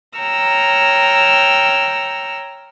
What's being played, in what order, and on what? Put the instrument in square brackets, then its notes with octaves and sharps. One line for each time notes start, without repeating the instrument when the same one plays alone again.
[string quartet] C#5 G5 A#5 E6 F6